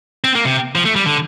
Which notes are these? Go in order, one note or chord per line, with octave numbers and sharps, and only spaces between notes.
C4
A#3
C3
F3
A3
G3
D3